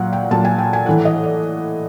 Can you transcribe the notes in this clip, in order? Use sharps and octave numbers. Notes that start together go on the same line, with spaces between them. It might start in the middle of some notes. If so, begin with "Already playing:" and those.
Already playing: A#2 F#3 F5 F#5
G5
A#2 F#3 A5
G#5
G5
G#5
A2 E3 F#5
D#5
D5